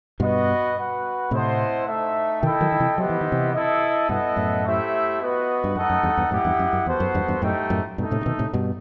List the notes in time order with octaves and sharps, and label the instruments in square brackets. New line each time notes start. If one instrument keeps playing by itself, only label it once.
[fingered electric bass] G2 B2 [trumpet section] B3 F#4 B4 D#5
[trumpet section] F#4 B4 F#5
[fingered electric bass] A2 C3 [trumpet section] E4 A4 C5 D#5 F#5
[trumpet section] A3 D#4 A4 E5
[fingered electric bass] B2 D#3 [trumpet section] E4 A4 D#5 G5
[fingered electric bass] D#3 F#3
D#3
C3 E3
[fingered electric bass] F#3 [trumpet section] B3 E4 G4 C5 D#5
[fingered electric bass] E3
D#3
C3 E3
[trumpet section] E4 A4 D#5
[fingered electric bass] G2 B2 [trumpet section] B3 E4 A4 D#5 F#5
[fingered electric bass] F#2 A2
[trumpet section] A3 E4 G4 C5 E5
B3 F#4 B4 D#5
[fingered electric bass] G2
[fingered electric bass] F#2 [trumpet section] A3 D#4 A4 D#5 F#5
[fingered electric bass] F#2
E2 G2
E2 G2
[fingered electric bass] F#2 A2 [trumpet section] E4 G4 D#5 F#5
[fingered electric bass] E2 G2
F#2
F#2
[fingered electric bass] E2 [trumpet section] B3 F#4 A4 C5
[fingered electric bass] F#2
E2 G2
E2 G2
[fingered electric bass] F#2 A2 [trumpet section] A3 D#4 G4 D#5 G5
[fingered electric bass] F#2 A2
[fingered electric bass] G2 B2 [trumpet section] A3 D#4 A4
[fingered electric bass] A2 C3
C3
B2 D#3
A2 C3
G2 B2